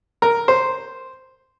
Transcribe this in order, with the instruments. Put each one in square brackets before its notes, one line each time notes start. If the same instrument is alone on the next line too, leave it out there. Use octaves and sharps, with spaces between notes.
[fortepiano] A#4
C5